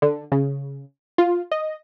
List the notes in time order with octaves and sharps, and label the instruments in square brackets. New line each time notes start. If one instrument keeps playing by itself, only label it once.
[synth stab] D3
C#3
F4
D#5